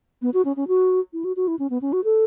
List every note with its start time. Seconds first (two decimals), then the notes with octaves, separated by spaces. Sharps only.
0.22 B3
0.34 F#4
0.45 C#4
0.56 C#4
0.68 F#4
1.13 E4
1.24 F#4
1.36 F#4
1.48 E4
1.59 C#4
1.70 B3
1.82 C#4
1.93 F#4
2.04 A4